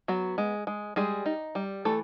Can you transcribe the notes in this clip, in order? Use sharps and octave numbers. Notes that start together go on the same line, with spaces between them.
F#3 B3 F#4
G#3
G#3
G3 G#3 G#4
D#4
G3
E3 A3 A4